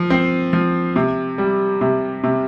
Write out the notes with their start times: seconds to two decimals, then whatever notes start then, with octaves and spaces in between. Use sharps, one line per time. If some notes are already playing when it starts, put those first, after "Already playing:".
Already playing: F3
0.10 C4
0.53 F3
0.96 C3
1.38 G3
1.81 C3
2.24 C3